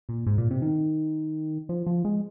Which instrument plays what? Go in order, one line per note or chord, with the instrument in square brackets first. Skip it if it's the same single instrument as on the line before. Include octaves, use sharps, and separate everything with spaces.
[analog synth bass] A#2
G#2
A#2
C3
D#3
F3
F3
G#3